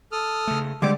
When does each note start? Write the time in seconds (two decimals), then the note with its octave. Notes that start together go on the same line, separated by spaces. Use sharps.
0.12 A4 D#6 F6
0.47 C#3 A3
0.82 D3 G3 G#3 G4 D5 D6